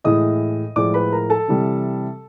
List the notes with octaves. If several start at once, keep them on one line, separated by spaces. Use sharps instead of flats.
A2 E3 G#3 D#5 D#6
A2 F3 G#3 D5 D6
B4 B5
A#4 A#5
A4 A5
C3 E3 G3